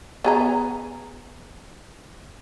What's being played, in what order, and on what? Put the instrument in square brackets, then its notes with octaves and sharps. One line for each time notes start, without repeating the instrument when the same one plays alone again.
[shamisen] B3 G#4 A#5